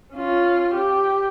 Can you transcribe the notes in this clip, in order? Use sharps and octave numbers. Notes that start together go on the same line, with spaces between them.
C#4 F4
G4